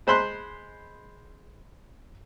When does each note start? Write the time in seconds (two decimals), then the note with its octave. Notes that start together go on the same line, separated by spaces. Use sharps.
0.07 G#3 C5 B5 C6 F#6